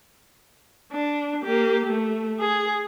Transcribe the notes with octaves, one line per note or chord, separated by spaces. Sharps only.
D4
A#3 G4
A3
G#4